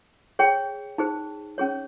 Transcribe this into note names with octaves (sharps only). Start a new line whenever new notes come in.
G#4 C#5 G5
D#4 G#4 C5
C#4 G#4 C#5